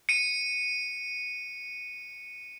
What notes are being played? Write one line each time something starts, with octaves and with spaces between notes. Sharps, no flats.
C#7 D#7